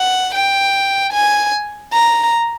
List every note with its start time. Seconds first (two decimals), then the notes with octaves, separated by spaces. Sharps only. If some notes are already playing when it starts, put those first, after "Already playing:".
Already playing: F#5
0.35 G5
1.13 G#5
1.93 A#5